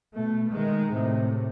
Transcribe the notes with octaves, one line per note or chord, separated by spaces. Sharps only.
B2 A3
D#3 G#3
A2 C3